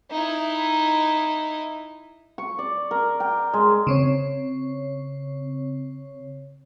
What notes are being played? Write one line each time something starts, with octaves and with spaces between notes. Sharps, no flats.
D#4 E4
C#6
D5
A#4
G5
G#3
C#3 C4 C#5